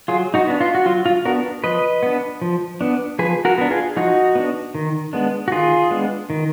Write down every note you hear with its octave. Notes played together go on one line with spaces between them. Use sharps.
F#3 F4 G#4
D#4 F#4
B3 D4
F4
F#4
F#3 F4
F4
B3 D4 F#4 A#4
F3 B4 D#5
B3 D4
F3
B3 D4
F3 G#4 B4
F#4 A#4
B3 D4
F4 G#4
F3 D#4 F#4
B3 D4
D#3
G#3 B3 D4
F#4
D#3 F4 G#4
G#3 B3 D4
D#3